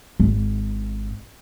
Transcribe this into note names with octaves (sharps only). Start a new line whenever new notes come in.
G#1